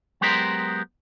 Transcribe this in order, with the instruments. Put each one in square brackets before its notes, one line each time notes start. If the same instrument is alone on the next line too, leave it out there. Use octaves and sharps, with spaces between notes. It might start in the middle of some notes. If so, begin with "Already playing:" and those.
[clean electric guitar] F#3 G#3 B3 G4 A#4 C5